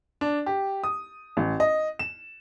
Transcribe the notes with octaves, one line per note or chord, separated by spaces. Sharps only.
D4
G4
D#6
A1
D#5
E7